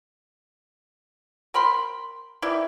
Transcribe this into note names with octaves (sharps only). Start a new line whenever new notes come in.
A#4 G5 B5 C6
D#3 E3 E4 D5